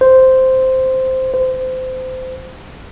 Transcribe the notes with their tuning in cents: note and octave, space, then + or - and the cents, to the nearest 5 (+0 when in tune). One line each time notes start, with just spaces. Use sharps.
C5 -5
C5 -25